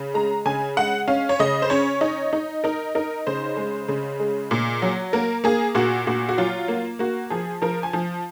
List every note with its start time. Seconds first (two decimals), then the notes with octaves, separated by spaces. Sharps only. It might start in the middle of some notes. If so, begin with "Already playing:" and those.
Already playing: C#3
0.14 G#3 A#5
0.45 C#3 G#5
0.77 G#3 F#5
1.08 C#4 F5
1.29 C#5
1.39 C#3 D#5
1.62 C5
1.70 C#4 C#5
2.01 D#4
2.33 D#4
2.64 D#4 A#4
2.95 D#4 A#4
3.27 C#3 C5
3.57 G#3
3.88 C#3
4.20 G#3
4.51 A#2
4.82 F#3
5.13 A#3 A#4
5.44 A#3 G#4
5.75 A#2 F#4
6.07 A#2 F#4
6.29 F#4
6.38 F#3 F4
6.68 A#3
6.99 A#3 F#4
7.30 F3 G#4
7.62 F3 A#4
7.83 G#5
7.93 F3